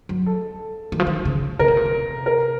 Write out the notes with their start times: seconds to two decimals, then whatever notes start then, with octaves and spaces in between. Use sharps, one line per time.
0.09 F#3
0.26 A4
0.92 D#3
1.00 F3
1.07 D#3
1.25 C#3
1.59 C#3 A#4
1.68 C3
1.77 A#2
1.86 C3
2.26 A#4